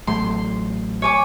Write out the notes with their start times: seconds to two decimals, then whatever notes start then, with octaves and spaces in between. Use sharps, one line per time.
0.07 A1 F#3 A3 C6
1.02 C#5 G#5 D6